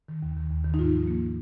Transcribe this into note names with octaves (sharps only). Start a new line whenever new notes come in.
D#3
D#2
D#3
D#2
D#3
D#4
G#2 F4
F3
A#3